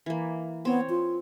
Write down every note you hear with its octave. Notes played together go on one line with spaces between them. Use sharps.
E3 A#3
B3 C4 C#5
F4